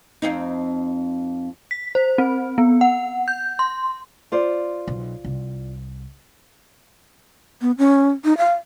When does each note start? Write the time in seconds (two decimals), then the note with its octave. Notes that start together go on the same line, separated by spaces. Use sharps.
0.22 F2 C4 D#4
1.71 B6
1.95 C5
2.18 C4
2.58 B3
2.81 F#5
3.28 G6
3.59 C6
4.32 F4 C5 D5
4.88 B1
5.25 C2
7.61 B3
7.78 C#4
8.25 D#4
8.38 F5